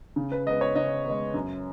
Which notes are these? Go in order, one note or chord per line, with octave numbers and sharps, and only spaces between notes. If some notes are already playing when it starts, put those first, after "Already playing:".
C#3
B4
G#3 B3 D#5
C#5
C#3 D#5
G#3 B3
F#2